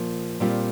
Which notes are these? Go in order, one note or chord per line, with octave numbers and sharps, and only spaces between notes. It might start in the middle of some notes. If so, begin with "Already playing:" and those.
Already playing: A#2 F3 A#3
A#2 G3 C4 F4